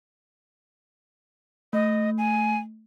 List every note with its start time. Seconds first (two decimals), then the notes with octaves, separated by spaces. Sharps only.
1.73 A3 D#5
2.18 G#5